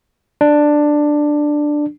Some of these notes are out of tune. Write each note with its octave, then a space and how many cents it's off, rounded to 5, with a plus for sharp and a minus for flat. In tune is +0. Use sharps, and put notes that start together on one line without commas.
D4 +10